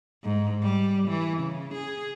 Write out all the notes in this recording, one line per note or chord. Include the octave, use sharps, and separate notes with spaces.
G#2
G3
E3
C#3
G#4